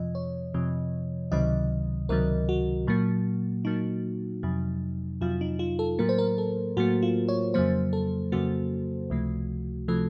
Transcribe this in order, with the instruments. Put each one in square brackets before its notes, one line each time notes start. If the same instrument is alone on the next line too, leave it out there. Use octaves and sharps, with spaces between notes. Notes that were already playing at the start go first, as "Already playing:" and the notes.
Already playing: [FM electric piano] F2 C3 F3 D#5
C#5
F2 C3 F3
C#2 C3 D#3 F#3 D#5
C#2 C3 D#3 F#3 A#4
F#4
A#2 F#3 A#3
A#2 F#3 A#3 D#4
F2 C3 F#3
F2 C3 F#3 F4
D#4
F4
A4
A2 F#3 A#3 A#4
C5
A#4
A4
A2 F#3 A#3 F#4
F4
C#5
F2 C#3 F#3 A#3 C5
A4
F2 C#3 F#3 A#3 F#4
C#2 C3 F3 A3
C3 F3 A3 A4